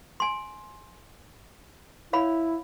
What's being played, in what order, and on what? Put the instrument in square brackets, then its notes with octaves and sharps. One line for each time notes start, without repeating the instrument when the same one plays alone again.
[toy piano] G#5 C6
[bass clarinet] E4 [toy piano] C#5 F5 B5